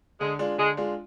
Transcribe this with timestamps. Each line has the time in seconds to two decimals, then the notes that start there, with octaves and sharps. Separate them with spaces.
0.20 D3 G#3
0.39 G#3 D4 F4
0.58 D3 G#3
0.77 G#3 D4 F4